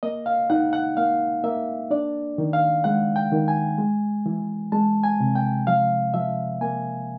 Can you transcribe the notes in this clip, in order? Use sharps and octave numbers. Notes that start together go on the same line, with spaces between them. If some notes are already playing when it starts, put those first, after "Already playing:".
A#3 D#5
F5
D#4 F#5
F#5
A#3 F5
A#3 E5
D4 D5
D#3
F5
G#3 F#5
G5
D#3
G#5
G#3
E3
G#3 A5
G#5
C3
G5
F3 F5
F3 E5
A#3 G#5